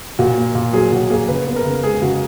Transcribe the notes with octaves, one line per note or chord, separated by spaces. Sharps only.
A#2 F#4
A#3
A#2
F#3 G#4
A#2 F#4
A#3 G#4
C#3 B4
B3
A#4
C#3
G#3 G#4
C#3 F#4